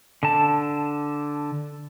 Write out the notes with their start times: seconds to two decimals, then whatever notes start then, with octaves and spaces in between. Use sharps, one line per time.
0.23 D3 A5